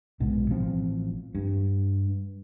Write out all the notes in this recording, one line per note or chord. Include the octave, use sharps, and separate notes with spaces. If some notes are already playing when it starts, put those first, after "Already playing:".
B1 G#2 B2
A1 F3 C4
G2